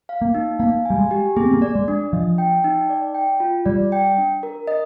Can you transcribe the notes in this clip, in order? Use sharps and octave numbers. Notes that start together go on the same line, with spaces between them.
F5
A#3
D#4
A#3 F5
G3 G#5
G#3
G4
A#3 G#4
C4
A#3
D5
G#3
D4
F3 D#5
G5
D#4
D5
G5
F4
G3 D5
G5
D4
A#4
D#5